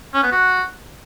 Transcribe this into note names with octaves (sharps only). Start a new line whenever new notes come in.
C#4
B3
F#4